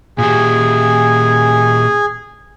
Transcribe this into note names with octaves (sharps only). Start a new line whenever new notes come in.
A#2 G4 G#4 G#5